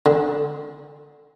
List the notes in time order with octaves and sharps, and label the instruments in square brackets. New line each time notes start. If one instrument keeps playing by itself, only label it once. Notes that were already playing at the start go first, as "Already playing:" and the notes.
[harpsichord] D3